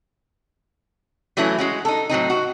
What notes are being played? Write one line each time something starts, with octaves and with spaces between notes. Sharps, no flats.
E3 F#3 A3 C#4 E4
G#3 C#4 F#4
D#4 A4
A2 F#3 C4 D#4
F#4